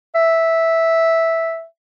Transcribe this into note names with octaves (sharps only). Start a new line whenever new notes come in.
E5